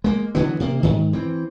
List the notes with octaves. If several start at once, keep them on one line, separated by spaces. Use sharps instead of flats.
G#3 A#3
D3 E3 F#3 B3
C3 A#3
G#2 D#3
E3 C4